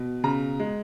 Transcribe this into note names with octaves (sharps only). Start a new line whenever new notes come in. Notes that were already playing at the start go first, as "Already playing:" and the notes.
Already playing: B2
C#3 A#5
G#3